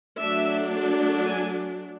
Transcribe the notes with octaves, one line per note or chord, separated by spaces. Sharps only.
F#3 A3 D4 E5
G#5